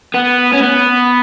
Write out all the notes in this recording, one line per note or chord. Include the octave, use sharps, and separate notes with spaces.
B3
C#4
B3